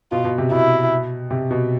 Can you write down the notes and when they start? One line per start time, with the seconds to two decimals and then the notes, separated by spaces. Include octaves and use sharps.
0.12 B2 F4
0.24 B2
0.38 C3
0.51 B2 E4
1.31 C3
1.51 B2